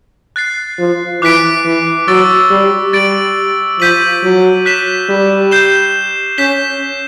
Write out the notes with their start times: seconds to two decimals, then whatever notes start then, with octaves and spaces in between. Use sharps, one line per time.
0.36 F#6 A6 C7
0.79 F3
1.22 E3 D6 F#6 B6 D7
1.65 E3
2.08 F#3 C#6 E6 A6 D7 G7
2.50 G3
2.93 G3 A6 D7 F#7
3.79 F3 G6 B6 D#7 F#7
4.23 F#3
4.66 F#6 B6 E7 G7
5.09 G3
5.51 G6 C7 E7 G7
6.38 C#4 G6 B6 E7 G7